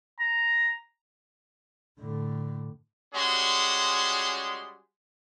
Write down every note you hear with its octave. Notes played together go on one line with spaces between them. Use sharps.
A#5
A2 D3
G3 G#3 C#4 F#4 G#4 C6